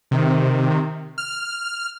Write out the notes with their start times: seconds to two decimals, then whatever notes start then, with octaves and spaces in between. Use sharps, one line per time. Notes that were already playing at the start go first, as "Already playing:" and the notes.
0.11 C3 D#3
1.18 F6